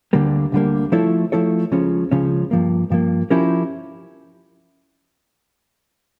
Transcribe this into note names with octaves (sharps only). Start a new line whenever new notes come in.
D2 D3 G3 A#3
D2 D3 G3 A#3
F3 A3 E4 A4 C#5
F3 A3 E4 A4 C#5
C#2 C#3 F3 C#4
C#2 C#3 F3 C#4
G2 F3 A#3
G2 F3 A#3
F3 C#4 E4 G4 A#4